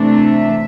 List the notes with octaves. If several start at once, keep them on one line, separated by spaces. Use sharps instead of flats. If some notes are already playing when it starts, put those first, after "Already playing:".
Already playing: C3 E3 A3 D4
E5